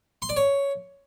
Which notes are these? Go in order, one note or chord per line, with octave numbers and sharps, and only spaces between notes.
C6
D5
C#5